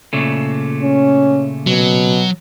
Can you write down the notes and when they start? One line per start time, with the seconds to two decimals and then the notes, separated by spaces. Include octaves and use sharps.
0.13 A#2 C#3 A3
0.82 C#4
1.67 B2 F#3